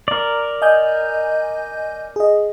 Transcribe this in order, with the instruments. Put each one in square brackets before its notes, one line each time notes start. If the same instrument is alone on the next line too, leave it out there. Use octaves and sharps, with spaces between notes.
[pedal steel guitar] A#4 D5
[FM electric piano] D#5 G#5 G6
G#4 D#5